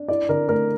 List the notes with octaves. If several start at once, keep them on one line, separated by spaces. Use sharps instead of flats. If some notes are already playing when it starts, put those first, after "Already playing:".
Already playing: D4
E4 D5
D3 A#4
A3 A#4